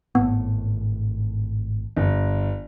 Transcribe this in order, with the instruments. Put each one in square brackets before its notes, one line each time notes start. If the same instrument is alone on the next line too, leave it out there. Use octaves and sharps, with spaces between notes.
[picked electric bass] G#1 A2 [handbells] B3
[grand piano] G1